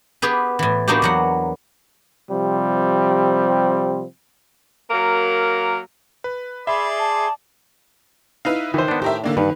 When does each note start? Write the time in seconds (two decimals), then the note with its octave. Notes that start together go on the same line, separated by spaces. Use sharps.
0.22 B3 G4 G#4 B4
0.59 A2 E3
0.88 A#3 B3 D4 D#4 F#4 G4
1.02 E2 F#3 F#5
2.30 C3 F3 G3 C4
4.90 F#3 A#3 A#4
6.24 B4
6.67 G#4 D5 E5 B5 C6
6.99 A5
8.45 D#4 E4 B4 F5
8.74 D#3 E3 C5
8.88 B3 D4
9.02 A2 G4 A#4 E5
9.24 D3 A#3 D4
9.37 G2 D#3 B4